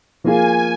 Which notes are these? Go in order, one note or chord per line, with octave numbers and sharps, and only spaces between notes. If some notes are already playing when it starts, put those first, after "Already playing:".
F3 A#3 F4 G#4 G#5